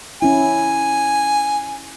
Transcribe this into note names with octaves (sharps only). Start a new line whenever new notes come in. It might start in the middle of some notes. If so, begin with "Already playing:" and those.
C#4 E4 G#5